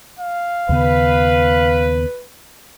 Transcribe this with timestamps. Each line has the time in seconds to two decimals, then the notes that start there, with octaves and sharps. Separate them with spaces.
0.19 F5
0.69 D#2 C#3 B3 B4